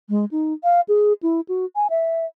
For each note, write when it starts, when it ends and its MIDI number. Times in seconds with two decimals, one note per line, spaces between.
0.09 0.25 56
0.31 0.53 63
0.64 0.81 77
0.89 1.13 68
1.23 1.41 64
1.49 1.65 66
1.76 1.88 80
1.90 2.26 76